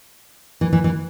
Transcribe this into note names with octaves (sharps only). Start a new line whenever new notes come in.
E3
E3
E3